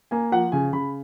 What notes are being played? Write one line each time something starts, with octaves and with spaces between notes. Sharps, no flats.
A#3 G#5
F3 F#5
C#3 G#5
C#3 B5